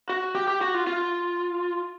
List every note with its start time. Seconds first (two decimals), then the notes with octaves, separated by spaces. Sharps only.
0.09 F#4
0.35 G4
0.48 G4
0.61 F#4
0.74 F4
0.87 F4